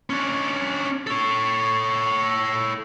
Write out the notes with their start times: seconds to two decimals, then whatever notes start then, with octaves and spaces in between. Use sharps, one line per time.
0.10 C#4 D4
1.07 A4 C#5